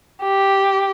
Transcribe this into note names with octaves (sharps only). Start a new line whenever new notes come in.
G4